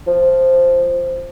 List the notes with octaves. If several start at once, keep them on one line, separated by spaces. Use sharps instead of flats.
F3